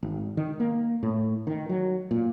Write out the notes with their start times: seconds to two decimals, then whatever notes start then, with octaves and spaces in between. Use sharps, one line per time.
0.03 G#1
0.37 D#3
0.60 A#3
1.03 A2
1.47 D#3
1.69 F#3
2.11 A#2